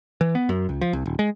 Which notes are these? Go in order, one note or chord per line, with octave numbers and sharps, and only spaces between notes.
E3
B3
F#2
C#2
F3
C2
D#1
G#3